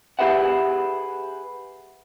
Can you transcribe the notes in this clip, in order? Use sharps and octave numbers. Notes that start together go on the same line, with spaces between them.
G4 G#4 B4 E5 F#5